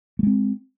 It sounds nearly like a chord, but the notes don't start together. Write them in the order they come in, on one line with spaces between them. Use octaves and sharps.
A3 G#3 C4